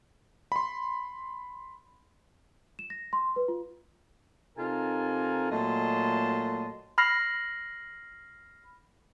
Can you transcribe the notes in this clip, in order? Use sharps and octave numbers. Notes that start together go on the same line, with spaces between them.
B5 C6
E7
A#6
C6
B4
F4
C3 D#4 F4 A4 A#4 G#5
A#2 F#3 A3 D#5 A5 C6
B5 F6 A#6 C7